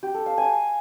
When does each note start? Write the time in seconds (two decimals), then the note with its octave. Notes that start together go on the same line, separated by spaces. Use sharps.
0.03 G4
0.14 A4
0.26 F5
0.38 G#5